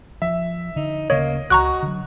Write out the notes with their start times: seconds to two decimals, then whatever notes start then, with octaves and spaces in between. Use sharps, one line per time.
0.22 F3 E5
0.76 D3 D#4
1.10 D1 C#3 A#3 C#4 C#5 D#5
1.50 C#2 F#4 A#5 C#6 F#6
1.82 D3 F#3